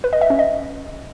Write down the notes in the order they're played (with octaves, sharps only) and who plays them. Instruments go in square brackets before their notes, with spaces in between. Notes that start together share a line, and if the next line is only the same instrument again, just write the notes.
[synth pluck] B4
D#5
E5
C#4
D#5